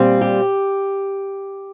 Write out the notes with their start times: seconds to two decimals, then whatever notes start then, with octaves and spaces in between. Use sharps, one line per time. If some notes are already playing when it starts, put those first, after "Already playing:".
Already playing: A#2 G3 C4
0.21 G4